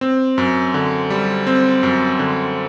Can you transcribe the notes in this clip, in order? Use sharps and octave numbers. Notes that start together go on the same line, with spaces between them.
C4
F#2
D3
G3
C4
F#2
D3